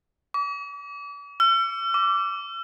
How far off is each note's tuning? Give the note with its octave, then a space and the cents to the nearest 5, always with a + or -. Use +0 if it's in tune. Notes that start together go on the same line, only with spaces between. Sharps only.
D6 -40
E6 +45
D6 -15